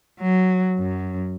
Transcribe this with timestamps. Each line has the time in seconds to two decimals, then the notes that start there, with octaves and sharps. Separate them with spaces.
0.20 F#3
0.79 F#2